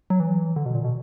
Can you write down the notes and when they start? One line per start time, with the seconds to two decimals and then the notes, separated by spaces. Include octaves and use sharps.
0.10 F#3
0.20 E3
0.56 D3
0.66 B2
0.75 A#2
0.84 B2